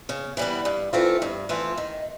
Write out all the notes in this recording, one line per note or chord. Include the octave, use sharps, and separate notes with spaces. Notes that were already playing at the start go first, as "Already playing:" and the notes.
C#3
E3 G3 B3
G2
E3 A3 C4 F4
G2
E3 A3 C4 F4
D#3